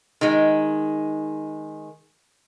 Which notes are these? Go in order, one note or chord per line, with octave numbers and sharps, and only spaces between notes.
D#3 G#3